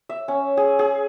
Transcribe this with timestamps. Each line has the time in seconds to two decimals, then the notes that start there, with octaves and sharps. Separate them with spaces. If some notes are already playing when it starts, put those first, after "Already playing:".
0.09 E5
0.28 C#4
0.57 G#4
0.79 G#4